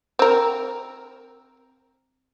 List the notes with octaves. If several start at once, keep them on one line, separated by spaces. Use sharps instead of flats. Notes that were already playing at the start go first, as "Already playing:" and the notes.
C4 A#4